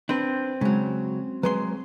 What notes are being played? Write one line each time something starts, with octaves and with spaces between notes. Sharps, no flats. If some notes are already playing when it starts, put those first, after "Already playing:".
C4 D4 B4
C#3 F#3 G#3
F#3 G#3 B4 C6